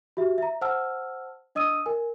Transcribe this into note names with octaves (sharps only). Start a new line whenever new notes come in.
F#4 G4 E5
E5 A#5
C5 F#5 A5 E6 F6
D4 D#5 D#6 E6 D#7
A#4 G#5